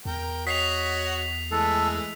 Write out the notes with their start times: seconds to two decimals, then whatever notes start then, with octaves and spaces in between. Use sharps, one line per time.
0.05 E2 A#4 G5
0.47 F#4 C#5 D#5 B6 C7 F7
1.51 E3 G#3 A3 A4